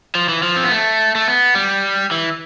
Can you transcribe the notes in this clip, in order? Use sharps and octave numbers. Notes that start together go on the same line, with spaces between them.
F3
E3
F3
C4
B3
A3
A3
B3
G3
E3